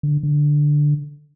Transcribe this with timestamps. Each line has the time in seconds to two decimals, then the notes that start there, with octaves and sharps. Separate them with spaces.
0.03 D3
0.23 D3